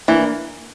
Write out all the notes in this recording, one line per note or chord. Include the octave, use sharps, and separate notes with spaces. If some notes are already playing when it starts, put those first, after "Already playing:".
E3 A#3 D4